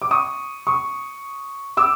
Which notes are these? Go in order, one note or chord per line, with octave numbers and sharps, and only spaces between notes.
D6
C#6 D#6
C#6 D#6
D6 E6